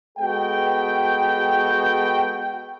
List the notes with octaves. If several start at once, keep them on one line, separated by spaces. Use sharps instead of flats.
G#3 B3 F#4 A4 G5